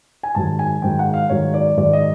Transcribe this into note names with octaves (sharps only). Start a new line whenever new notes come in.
G#5
G#2 D#3 F#3 A5
G#5
G#2 D#3 F#3 G5
F#5
F5
G#2 D#3 F#3 C#5
D5
G#2 D#3 F#3 D5
D#5